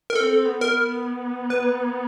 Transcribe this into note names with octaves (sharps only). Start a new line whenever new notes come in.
A#4
C4 A4
B3
A#4
B3
B4